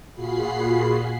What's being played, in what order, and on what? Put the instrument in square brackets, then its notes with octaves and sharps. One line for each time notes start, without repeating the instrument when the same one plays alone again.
[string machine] A#2 F4 F#4 G#4 B5 C7